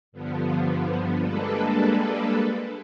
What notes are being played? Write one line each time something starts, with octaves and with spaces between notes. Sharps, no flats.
G2 D3 F3 B3
G3 G#3 A#3 D4 A4 B4